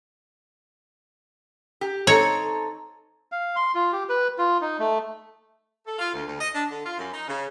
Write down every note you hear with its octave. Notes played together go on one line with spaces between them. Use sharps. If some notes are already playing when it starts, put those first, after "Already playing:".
G4
C4 D#4 A4 C#5
F5
C6
F4
G4
B4
F4
D#4
A3
A4
F4
D2
D2
D#5
D4
D3
F4
F#2
D#4
C#3